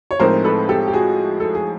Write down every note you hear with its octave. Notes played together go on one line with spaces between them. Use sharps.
C#5
A2 F3 G#3 C4 D#4 A#4 C5
A4 B4
G4 A4
G4
F#4 G#4
A4
G#4